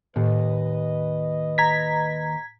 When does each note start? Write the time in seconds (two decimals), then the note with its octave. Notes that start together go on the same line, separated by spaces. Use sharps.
0.16 D#2 A2 B4 D#5
1.58 A#5 G#6 B6